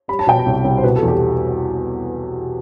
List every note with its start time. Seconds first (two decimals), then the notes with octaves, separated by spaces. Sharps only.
0.08 G3 B5
0.19 A5
0.27 B2 G5
0.39 A5
0.46 C2
0.65 C2
0.78 C5
0.83 B2 B4
0.96 A4
1.02 E2
1.08 G4